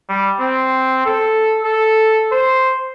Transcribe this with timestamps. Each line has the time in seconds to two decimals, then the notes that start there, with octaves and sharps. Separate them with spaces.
0.09 G3
0.40 C4
1.06 A4
1.64 A4
2.31 C5